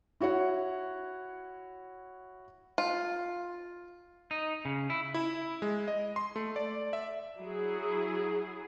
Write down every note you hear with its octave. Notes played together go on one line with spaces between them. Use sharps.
E4 F#4 C#5 F#5
F4
D#4
C#3
E4
E4
G#3
D#5
C6
A3
D5
E5
F#3 E4 G#4